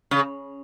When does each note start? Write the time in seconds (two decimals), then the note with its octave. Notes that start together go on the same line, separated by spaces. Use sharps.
0.11 C#3